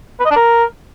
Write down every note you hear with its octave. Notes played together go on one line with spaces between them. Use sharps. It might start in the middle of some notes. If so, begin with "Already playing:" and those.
B4
D#5
D4
A#4